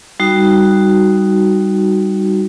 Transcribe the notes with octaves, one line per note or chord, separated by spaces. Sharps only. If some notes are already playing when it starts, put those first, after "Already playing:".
G3 D#4 F#4